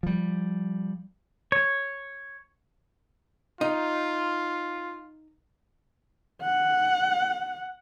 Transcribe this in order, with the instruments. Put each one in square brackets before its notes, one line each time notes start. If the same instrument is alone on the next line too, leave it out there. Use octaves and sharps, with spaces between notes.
[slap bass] F3 G3
[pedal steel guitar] C#5
[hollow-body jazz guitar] D#4 [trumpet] F4
[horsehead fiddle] F#5